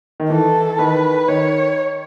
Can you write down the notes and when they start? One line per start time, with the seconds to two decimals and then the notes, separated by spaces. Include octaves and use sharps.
0.20 D#3
0.30 E3 A4
0.79 D#3 B4
1.28 D#3 C#5